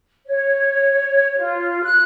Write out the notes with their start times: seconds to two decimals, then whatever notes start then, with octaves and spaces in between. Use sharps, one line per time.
0.26 C#5
1.39 F4
1.84 F#6